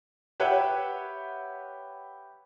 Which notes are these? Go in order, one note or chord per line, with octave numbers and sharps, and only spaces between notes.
G4 B4 C#5 E5 F#5 G5